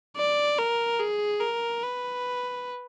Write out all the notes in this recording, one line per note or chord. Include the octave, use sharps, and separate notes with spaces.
D5
A#4
G#4
A#4
B4